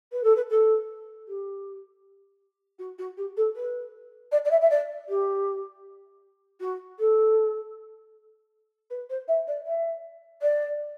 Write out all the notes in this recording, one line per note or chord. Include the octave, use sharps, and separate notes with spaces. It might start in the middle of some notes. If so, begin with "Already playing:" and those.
B4
A4
B4
A4
G4
F#4
F#4
G4
A4
B4
D5
D5
E5
E5
D5
G4
F#4
A4
B4
C5
E5
D5
E5
D5